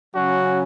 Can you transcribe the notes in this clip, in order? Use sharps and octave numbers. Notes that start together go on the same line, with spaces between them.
C#3 F#3 C#4 F#4